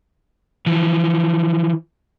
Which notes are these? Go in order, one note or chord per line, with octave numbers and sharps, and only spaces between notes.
E3 F3